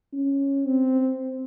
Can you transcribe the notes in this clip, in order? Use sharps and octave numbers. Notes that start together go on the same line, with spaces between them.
C#4
C4